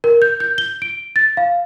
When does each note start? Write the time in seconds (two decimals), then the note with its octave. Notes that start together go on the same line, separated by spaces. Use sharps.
0.04 A#4
0.22 G6
0.40 G6
0.58 G7
0.82 D7
1.16 A6
1.37 F5